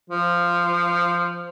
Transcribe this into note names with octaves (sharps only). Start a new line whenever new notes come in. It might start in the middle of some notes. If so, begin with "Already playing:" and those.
F3